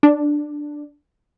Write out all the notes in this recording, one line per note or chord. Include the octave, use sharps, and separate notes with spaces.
D4